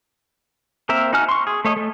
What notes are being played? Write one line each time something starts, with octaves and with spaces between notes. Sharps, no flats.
A#3 C4 A#4 E5
D#4 F#4 G#5 F6
C6 C#6
G#4
A3 C#5 D#5
A3